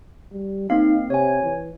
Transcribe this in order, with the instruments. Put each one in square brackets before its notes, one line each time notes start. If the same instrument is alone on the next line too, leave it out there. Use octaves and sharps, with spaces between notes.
[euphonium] G3
[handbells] A#3 C4 F5 [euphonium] D#4
[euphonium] C3 [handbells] C#5 G#5
[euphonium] E3